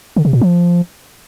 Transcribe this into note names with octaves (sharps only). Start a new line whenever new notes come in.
D3
C3
A#2
F3